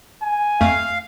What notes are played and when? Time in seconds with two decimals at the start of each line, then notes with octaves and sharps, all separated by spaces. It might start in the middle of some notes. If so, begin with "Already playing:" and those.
0.22 G#5
0.61 F2 A3 F5